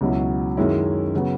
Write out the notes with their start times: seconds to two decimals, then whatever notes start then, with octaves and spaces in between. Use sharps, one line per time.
0.01 C#2 B2 F#3 C#4 E4
0.57 F#2 D#3 G#3 C#4 E4
1.14 C#3 F#3 B3